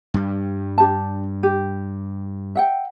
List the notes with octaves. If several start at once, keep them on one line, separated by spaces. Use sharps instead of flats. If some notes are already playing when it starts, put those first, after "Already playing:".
G2 G3
D4 G4 A5
G4
E5 F#5 G5